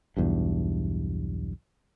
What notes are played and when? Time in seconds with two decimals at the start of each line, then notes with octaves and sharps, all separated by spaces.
0.17 B1 E2 G2